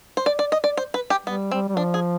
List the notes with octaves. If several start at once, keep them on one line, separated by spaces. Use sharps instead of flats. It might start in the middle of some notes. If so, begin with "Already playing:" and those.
C5
D5
D5
D#5
D5
C5
B4
G4
G3 B3
G3 C4
G3
F3 D4
G#4